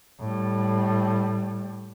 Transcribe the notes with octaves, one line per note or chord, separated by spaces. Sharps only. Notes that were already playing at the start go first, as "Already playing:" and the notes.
A2 G3